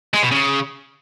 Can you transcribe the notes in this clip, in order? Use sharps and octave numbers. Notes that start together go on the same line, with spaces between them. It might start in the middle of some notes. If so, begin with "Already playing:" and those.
G#3
B2
C#3